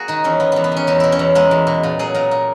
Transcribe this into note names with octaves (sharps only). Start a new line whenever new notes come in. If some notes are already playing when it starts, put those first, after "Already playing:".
Already playing: A#3 F#4 G#4
D#3 D#4
E2 C#4
A#3 B3
E2 B3
B3
D#3 C#4
E2 D#4
B2 E4
C#4
E2
G#3 A#3
E2
B2
A#2
F#3 G#4
A#2 A#4
A#3